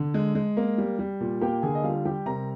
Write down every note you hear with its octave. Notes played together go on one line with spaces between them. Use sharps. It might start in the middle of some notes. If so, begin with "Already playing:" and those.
Already playing: D3
G#3
G#3
A#3
G3
G3
A#2
A#3 G4 G5
D3 G#4 G#5
D#5
G3 F4 F5
G3 G4 G5
C3 A#4 A#5